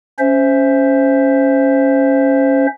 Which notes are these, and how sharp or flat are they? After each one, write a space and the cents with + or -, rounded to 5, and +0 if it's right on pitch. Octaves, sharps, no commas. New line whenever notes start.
C#4 +0 C5 +0 E5 +0